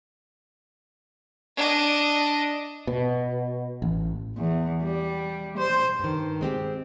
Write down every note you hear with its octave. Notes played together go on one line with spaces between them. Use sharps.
D4 D#5
B2
A1
E2
G3
C5
G2 D#3
G#3 C4 G4